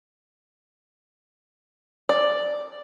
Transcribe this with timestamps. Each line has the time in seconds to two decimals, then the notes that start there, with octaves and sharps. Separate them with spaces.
2.09 D5